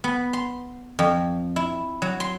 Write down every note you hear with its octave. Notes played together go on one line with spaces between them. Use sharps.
B3
C6
F2
E4
F#3
C6